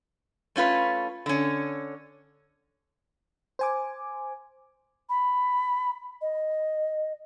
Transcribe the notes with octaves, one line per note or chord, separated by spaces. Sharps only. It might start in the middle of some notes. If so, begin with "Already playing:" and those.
A3 C#4 F4 B4
D3 C#4
C5 G#5 D6
B5
D#5